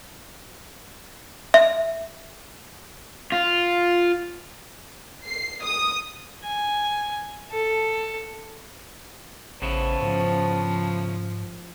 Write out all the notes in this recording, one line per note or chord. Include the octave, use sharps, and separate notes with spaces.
E5
F4
C7
D#6
G#5
A4
A1 C#3 B3 E4 C5 A5
G#2 F3